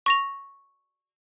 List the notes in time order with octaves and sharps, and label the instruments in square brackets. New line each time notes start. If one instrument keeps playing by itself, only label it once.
[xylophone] C#6 A#6 F7